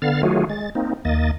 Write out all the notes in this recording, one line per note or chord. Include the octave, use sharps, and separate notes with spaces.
D3 B3 F5 F6 A6
D#3 F#3 A3 F4 F#4 G#4
G#3 A6
A#3 C4 D#4
D#2 A#3 D#5 A6